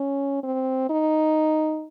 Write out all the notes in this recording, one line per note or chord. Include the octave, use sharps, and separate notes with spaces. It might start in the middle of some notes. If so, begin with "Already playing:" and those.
Already playing: C#4
C4
D#4